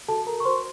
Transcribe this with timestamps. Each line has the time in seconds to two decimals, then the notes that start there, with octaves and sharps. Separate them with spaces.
0.08 F#4 A4 A5
0.27 A#4 A#5
0.40 C#6
0.45 F#4 C5 C6